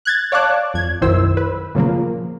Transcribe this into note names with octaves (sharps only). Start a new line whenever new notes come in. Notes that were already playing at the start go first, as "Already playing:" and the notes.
F#6 G#6 A6
C#5 D5 F5 A5 D6 F#6
F2 G#6
B1 F#2 D#3 E4 C5 E6
B4
A#2 C#3 F3 A#3